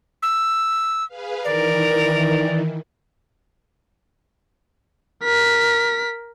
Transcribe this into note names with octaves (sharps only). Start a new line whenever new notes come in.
E6
G#4 B4 F5
D#3 E3 A#4 D5
A#4 B6